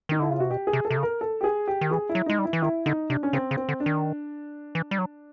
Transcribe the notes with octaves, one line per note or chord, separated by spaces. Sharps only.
D#3 D#4
D3 E4
C#3 F4
C3 F#4
B2 G4
G#4
C3
A4
C3
C#3
A#4
A4
G4
G#4
G4
D#3
E3 G#4
E4
F#3
G#3 D#4
G3
E4
E3
D#3 E4
D3 D#4
C3 D4
C#4
C#3 C4
C#3
C4
D3
D4
D#3
E3
G3
F#3